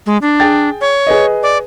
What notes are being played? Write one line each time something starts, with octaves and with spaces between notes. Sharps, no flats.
G#3
D4
G#4 G5 A6
C#5
G#4 B4 D#5
D5